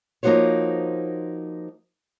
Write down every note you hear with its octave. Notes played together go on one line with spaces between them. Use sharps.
F3 A#3 D#4 F#4 C5 C#5